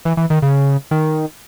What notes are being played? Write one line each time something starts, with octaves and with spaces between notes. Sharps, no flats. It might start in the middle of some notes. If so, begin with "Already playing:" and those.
E3
E3
D#3
C#3
D#3